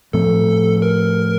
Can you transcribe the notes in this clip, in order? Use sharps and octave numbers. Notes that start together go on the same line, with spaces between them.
A2 F3 A3 C4 A4
A#4